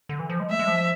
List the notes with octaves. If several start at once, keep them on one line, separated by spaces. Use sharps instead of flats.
D3
E3
F3
G#3
A3 E5
G#3
F3